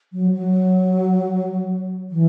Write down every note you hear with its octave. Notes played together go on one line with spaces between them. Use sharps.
F#3
F#3
E3